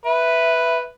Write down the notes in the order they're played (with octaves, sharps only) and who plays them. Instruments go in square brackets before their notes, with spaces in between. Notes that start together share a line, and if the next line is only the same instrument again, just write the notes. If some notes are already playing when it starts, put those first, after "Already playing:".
[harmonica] B4 [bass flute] E5